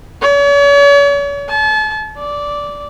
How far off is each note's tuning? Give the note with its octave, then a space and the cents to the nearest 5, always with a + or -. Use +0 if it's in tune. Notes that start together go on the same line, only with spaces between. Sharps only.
C#5 +40
A5 -35
D5 -10